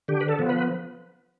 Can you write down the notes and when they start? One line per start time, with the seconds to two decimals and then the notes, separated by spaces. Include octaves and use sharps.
0.08 D3 G4
0.20 B4
0.28 A4
0.39 F3 B3
0.49 B4